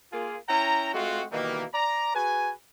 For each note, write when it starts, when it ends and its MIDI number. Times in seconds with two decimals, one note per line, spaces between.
0.12 0.36 58
0.12 0.36 65
0.12 0.36 68
0.48 0.92 61
0.48 0.92 64
0.48 0.92 79
0.48 0.92 82
0.93 1.23 56
0.93 1.23 57
0.93 1.23 60
0.93 1.23 65
0.93 1.23 66
1.31 1.64 47
1.31 1.64 51
1.31 1.64 52
1.31 1.64 55
1.31 1.64 58
1.73 2.14 74
1.73 2.14 82
2.14 2.51 66
2.14 2.51 68
2.14 2.51 71
2.14 2.51 80